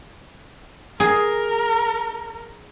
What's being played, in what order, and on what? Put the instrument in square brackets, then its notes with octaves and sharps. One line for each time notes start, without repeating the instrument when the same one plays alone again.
[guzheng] G#4 [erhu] A#4